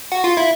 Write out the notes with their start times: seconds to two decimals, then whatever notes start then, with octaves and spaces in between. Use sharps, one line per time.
0.12 F#4
0.24 F4
0.37 E4